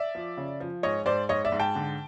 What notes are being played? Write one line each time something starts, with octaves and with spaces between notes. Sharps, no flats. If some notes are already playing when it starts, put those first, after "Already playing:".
Already playing: D5 E5
F3
C#3
F3
G#2 C#5 D#5
G#2 C5 D5
G#2 C#5 D#5
D5 E5
G#2
G5 A5
D3